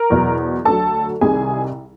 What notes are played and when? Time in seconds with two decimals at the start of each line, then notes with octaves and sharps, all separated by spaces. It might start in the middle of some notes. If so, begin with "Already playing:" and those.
Already playing: A#4 A#5
0.10 E2 B2 F#3
0.65 D2 D3 F#3 A4 A5
1.21 C2 C3 D#3 G3 G#4 G#5